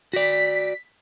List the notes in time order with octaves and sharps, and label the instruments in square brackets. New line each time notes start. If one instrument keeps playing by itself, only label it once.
[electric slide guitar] F#4 D5 [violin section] B6